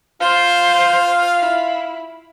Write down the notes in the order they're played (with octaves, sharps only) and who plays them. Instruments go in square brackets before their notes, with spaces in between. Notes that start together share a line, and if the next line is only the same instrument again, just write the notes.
[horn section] F4 F5 [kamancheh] C5
[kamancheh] E4